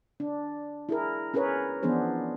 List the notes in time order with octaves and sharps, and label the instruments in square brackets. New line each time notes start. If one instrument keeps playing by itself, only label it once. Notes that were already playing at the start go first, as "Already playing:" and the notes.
[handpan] D4
E4 G#4 A#4
C#4 G#4 A#4 B4 C#5
E3 F3 B3 D4 G#4 C5